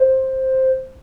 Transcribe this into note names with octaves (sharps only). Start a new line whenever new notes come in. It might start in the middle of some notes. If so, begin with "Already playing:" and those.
Already playing: C5